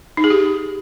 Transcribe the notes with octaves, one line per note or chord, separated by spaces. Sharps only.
D#4
G#4
G4